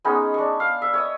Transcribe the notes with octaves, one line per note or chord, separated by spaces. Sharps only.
G#3 B3 C#4 D#4
D4 C#6
F5
E5
C#5 D#5